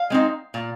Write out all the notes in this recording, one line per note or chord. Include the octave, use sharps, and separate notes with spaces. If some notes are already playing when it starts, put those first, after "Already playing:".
Already playing: F5
G#3 C4 D#4
A#2